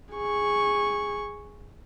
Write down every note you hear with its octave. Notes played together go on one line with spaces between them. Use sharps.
G#4 C#6